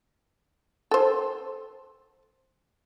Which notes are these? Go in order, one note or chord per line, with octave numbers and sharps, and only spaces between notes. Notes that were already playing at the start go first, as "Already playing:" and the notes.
A4 C5